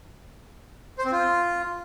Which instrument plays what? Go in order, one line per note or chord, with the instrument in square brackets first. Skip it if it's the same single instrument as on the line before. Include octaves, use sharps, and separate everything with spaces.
[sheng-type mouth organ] C5
C4
F4